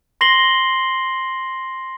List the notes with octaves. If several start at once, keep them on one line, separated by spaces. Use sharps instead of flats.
C6 A#6 C7 F#7 G7